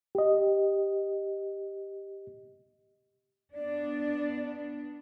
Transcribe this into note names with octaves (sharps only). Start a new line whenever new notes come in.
G4 D#5
B3 D4 D5